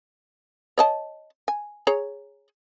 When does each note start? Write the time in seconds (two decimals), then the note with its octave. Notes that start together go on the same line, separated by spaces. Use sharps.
0.78 C#5 D#5 A5
1.48 G#5
1.87 G#4 C#5 A#5